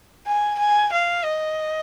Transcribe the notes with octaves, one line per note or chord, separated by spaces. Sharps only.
G#5
G#5
F5
D#5